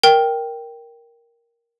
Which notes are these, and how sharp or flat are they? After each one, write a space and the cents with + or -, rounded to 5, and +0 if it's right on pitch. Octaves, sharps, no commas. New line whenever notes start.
A#4 +5 G5 +0